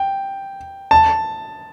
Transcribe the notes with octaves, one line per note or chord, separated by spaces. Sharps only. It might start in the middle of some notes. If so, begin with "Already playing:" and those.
Already playing: G5
A5